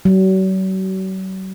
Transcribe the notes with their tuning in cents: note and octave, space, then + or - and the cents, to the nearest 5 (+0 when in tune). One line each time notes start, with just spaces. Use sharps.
F#3 +40